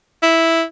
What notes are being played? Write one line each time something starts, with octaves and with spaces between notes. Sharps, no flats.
E4